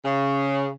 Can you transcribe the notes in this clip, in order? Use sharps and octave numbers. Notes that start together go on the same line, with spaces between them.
C#3